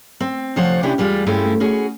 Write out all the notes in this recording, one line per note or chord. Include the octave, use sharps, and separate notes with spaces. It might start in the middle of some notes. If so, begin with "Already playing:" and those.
C4
D2 C3 F3 C5 C#5 F#5
C3 C#4 D4 E4 G4
E2 G3 G#3 F4
G2 G#3 A3 C4 C#4 E4
C#4 F#4 G#4